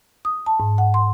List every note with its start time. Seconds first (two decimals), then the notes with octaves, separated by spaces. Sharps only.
0.25 D#6
0.46 A5
0.60 G#2
0.78 F#5
0.94 C6